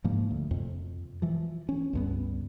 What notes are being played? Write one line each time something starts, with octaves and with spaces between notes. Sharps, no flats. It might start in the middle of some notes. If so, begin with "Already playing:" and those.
G#2 F3 A#3
D2
F2 C3
E3 F3
C#4
C#2 G2 B3